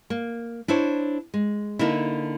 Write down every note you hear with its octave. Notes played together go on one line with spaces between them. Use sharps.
A#3
D4 E4 C5 C#5
G#3
D3 A#3 D#4 E4